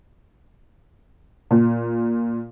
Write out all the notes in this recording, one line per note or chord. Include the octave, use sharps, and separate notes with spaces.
A#2